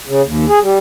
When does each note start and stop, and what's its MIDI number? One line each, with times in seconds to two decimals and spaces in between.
0.07 0.22 49
0.24 0.46 39
0.48 0.59 68
0.62 0.78 55